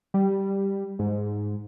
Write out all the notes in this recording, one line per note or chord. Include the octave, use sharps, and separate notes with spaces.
G3
G#2